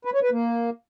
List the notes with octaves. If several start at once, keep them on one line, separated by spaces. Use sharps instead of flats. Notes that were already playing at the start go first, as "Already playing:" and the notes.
B4
C#5
B4
A#3